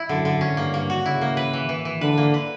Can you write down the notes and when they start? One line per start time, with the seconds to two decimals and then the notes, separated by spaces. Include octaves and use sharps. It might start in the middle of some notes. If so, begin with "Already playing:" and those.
Already playing: E4
0.09 F#2 D3
0.25 D3
0.41 C#4
0.57 G2 A#3
0.74 A#3
0.90 F#4
1.05 C#3 E4
1.21 A#3
1.37 B4
1.53 E3
1.69 E3
1.85 E3
2.01 D3 B4
2.18 A#3
2.34 B4